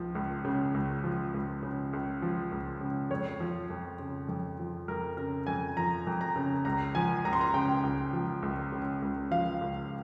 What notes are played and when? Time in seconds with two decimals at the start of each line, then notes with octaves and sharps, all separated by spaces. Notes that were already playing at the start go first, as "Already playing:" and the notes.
Already playing: C#2 F3
0.15 C#2
0.45 C#3
0.74 C#2
1.04 F3
1.34 C#2
1.63 C#3
1.93 C#2
2.22 F3
2.52 C#2
2.81 C#3
3.10 F2 C#5
3.40 F3
3.70 F2
3.99 C#3
4.29 F2
4.59 F3
4.88 F2 A#4
5.17 C#3 A#4
5.47 F2 G#5
5.77 F3 A#5
6.07 F2
6.21 A#5
6.36 C#3
6.65 C#2 A#5
6.95 F3 G#5
7.25 C#2 A#5
7.33 C6
7.41 A#5
7.54 C#3 G5
7.83 C#2
8.13 F3
8.42 C#2
8.72 C#3
9.02 C#2
9.31 F3 F5
9.61 C#2